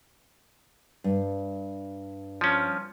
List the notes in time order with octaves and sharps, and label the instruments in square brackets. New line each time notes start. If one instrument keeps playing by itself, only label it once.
[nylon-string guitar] G2
[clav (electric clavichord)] F3 C#4